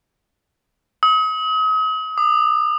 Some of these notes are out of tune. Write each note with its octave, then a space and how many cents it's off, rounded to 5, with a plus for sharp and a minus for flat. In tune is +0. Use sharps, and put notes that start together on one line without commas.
D#6 +40
D#6 -45